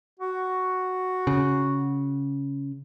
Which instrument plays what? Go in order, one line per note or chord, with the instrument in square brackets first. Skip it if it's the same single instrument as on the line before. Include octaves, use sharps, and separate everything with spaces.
[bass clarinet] F#4
[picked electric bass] C#3